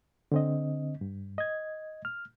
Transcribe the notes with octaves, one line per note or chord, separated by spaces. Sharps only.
D3 C4 D#5
G2
D#5 G#6
F6